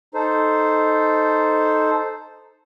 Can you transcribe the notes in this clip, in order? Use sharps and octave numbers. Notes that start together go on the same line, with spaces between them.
D#4 A4 C5